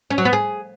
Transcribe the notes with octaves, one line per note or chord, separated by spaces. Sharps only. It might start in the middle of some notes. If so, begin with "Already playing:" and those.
C#4
F#3
B3
G#4